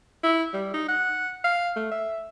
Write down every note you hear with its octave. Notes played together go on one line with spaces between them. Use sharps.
E4
G3
D#4
F#5
F5
A3
E5